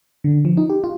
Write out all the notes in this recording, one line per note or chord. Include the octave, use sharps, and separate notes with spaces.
D3
F3
D#4
G4
F4